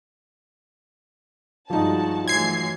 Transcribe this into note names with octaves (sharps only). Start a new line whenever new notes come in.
G2 F3 G#3 D#4 F#4 A5
E3 F#3 G#3 A3 G#6 C7